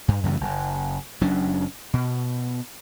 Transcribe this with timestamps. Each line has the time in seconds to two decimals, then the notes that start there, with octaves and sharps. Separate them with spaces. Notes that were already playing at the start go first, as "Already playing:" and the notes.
0.08 G2
0.23 F#2 C#3 E3 A3
0.41 F#1
1.21 F#1 F#3 C#4 D4
1.94 B2